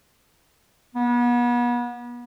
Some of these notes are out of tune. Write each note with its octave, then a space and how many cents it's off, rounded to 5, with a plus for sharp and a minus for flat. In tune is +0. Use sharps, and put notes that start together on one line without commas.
B3 -35